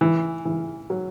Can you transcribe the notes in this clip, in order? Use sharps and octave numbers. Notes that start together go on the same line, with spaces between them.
E3
E3
F#3